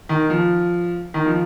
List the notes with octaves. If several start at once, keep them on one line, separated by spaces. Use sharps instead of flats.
D#3
F3
D#3
F3